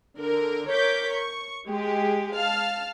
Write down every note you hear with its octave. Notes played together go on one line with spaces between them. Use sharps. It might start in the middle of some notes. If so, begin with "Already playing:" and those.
D3 A#4
A#4 C#5 D6 G6 B6
C#6
G#3 G4
F5 A5 F6